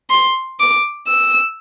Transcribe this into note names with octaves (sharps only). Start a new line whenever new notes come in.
C6
D6
E6